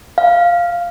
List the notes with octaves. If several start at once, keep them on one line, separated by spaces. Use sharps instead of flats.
F5